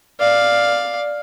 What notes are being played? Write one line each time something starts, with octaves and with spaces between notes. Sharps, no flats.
D5 F5